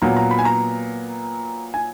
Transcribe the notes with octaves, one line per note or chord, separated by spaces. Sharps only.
A#2 F#3 B3 A#5
A#5
B5
G#5
A#5
G#5